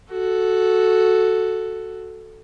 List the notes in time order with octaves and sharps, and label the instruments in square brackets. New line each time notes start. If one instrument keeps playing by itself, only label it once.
[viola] F#4 A4